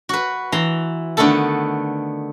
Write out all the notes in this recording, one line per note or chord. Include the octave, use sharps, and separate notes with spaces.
F#4 B4
E3 A#5 C6
D3 D#3 A3 B3 A4